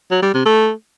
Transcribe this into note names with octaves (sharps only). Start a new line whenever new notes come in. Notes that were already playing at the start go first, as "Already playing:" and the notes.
F#3
G3
C3
A3